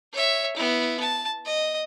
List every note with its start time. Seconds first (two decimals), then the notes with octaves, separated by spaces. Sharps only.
0.13 C#5 E5
0.56 B3 E4
1.00 A5
1.45 D#5